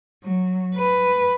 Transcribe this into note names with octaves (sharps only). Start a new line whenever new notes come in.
F#3
B4